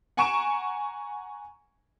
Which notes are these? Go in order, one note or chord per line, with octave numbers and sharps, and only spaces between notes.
F#5 G#5 A#5 C#6 D7 E7